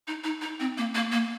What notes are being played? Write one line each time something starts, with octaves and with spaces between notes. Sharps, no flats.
D#4
D#4
D#4
C4
A#3
A#3
A#3